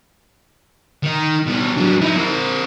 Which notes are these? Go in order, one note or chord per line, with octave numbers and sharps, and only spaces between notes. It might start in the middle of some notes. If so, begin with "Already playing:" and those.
D#3 D#4
B2 G3
F#3 D4
D#4 E4
C4 A#4